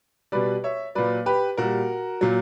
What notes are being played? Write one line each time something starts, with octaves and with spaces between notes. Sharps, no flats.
B2 G3 B4 D5
C#5 E5
A#2 F#3 B4 D5
G4 B4
A#2 G3 F#4 A#4
A#2 F#3